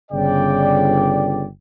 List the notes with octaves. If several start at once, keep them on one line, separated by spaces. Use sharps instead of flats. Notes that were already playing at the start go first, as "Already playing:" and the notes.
G1 C#3 D5 G5